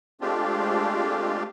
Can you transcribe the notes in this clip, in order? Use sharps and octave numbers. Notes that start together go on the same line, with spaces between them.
G#3 A3 C4 D4 F4 G4